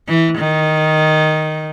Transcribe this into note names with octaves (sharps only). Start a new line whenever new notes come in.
E3
D#3